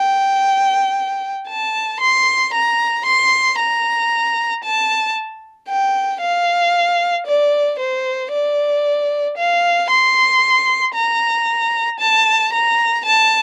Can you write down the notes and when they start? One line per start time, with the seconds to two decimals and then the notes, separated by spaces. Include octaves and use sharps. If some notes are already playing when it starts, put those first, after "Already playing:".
Already playing: G5
1.48 A5
2.01 C6
2.53 A#5
3.06 C6
3.59 A#5
4.64 A5
5.69 G5
6.21 F5
7.27 D5
7.79 C5
8.32 D5
9.37 F5
9.90 C6
10.94 A#5
12.00 A5
12.53 A#5
13.05 A5